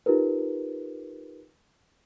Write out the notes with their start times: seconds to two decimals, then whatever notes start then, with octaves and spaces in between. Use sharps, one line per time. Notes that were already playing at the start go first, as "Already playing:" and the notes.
0.06 D#4 F4 G4 A#4 B4